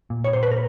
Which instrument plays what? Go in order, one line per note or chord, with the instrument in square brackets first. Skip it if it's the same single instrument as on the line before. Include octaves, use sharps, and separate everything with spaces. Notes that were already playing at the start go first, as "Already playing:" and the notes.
[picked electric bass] A#2
[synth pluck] C#5
[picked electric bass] A#2 [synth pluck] C5
[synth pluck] B4
A#4